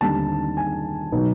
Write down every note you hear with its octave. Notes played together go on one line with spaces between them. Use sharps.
D#2 D3 G3 C4 D#4 A5
G#5
B2 F#3 B3 D#4